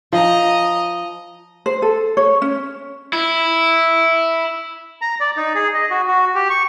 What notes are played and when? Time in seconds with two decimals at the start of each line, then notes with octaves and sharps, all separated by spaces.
0.13 F3 D#5 A#5
1.66 C5
1.82 A4
2.17 C#5
2.42 C#4
3.13 E4
5.02 A#5
5.20 D5
5.37 D#4
5.55 G#4
5.74 D#5
5.90 F#4
6.07 F#4
6.35 G4
6.50 C#6